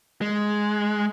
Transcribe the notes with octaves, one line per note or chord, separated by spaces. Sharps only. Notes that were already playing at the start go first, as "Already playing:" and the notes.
G#3